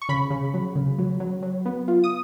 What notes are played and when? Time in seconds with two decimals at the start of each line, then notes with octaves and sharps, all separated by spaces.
0.02 C#6
0.09 C#3 B5
0.30 C#3
0.54 F#3
0.76 C#3
0.98 F#3
1.20 F#3
1.43 F#3
1.66 B3
1.88 F4
2.04 D#6